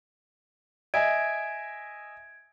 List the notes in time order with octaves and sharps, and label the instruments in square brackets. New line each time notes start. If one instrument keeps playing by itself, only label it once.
[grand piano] D#5 E5 G#5 [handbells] G#6 D7